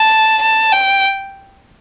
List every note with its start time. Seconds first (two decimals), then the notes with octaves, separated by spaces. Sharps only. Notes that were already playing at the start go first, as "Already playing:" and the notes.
Already playing: A5
0.41 A5
0.72 G5